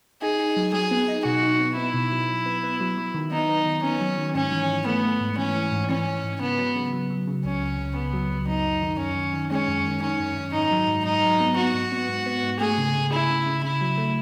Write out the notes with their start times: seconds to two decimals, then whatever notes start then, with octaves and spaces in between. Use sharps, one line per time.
0.22 D#4 G#4
0.39 D#4
0.57 F#3
0.73 F#3 G#4
0.91 B3
1.08 D#4
1.25 B2 F#4
1.43 D#4
1.59 B3
1.76 B3 E4
1.94 B2
2.12 F#3
2.28 F#3
2.46 B3
2.63 B3
2.80 F#3
2.98 F#3
3.14 D#3
3.31 B3 D#4
3.49 B3
3.66 D#3
3.83 B3 C#4
4.01 F#3
4.18 D#3
4.35 G#2 C#4
4.52 E3
4.69 G#2
4.87 A3 B3
5.04 A3
5.21 G#2
5.38 E3 C#4
5.55 E3
5.72 G#2
5.90 E3 C#4
6.06 E3
6.24 G#2
6.41 C#3 B3
6.58 F#3
6.76 C#3
6.93 F#3
7.10 F#3
7.27 C#3
7.45 C#2 C#4
7.62 C#3
7.78 C#2
7.96 C#2 B3
8.13 F#3
8.30 C#2
8.48 F#2 D#4
8.64 F#2
8.82 D#3
8.99 F#2 C#4
9.16 D#3
9.34 D#3
9.51 G#3 C#4
9.68 F#2
9.85 D#3
10.02 D#3 C#4
10.20 F#2
10.37 F#2
10.53 G#2 D#4
10.71 F#3
10.88 G#2
11.05 G#2 D#4
11.23 F#3
11.40 B3
11.57 B3 F#4
11.74 G#2
11.92 B3
12.09 G#2
12.26 B3
12.43 G#2
12.60 A3 G#4
12.78 C#3
12.95 C#3
13.12 C#3 E4
13.29 C#3
13.46 C#3
13.63 C#3 E4
13.81 F#3
13.97 A3